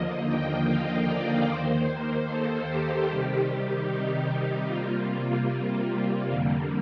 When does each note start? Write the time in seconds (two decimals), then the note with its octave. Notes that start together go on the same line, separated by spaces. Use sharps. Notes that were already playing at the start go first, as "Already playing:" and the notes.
Already playing: D#2 D3 F3 A#3 D#5
0.28 G5
0.68 F5
1.08 D5
1.48 D#2 D#3 A#3 C5
2.28 A4
2.68 G4
3.08 C3 D#3 G3 G4
3.88 D#4
4.68 C3 G3 A#3 F4
5.08 F4
5.48 F4
5.89 F4
6.29 F2 D3 G3 A#3